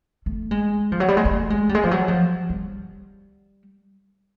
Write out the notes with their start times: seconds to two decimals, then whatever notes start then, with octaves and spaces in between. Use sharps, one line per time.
0.26 A3
0.51 G#3
0.92 F3
1.00 F#3
1.08 G3
1.17 G#3
1.25 A3
1.50 G#3
1.69 G3
1.75 G#3
1.84 F3
1.91 F#3
2.08 F3
2.50 G3